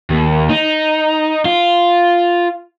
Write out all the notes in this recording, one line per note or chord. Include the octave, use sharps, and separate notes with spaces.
D#2
D#4
F4